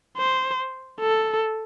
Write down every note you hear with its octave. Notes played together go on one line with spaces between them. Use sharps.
C5
A4